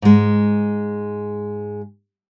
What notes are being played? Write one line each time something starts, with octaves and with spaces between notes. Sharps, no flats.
G#2 G#3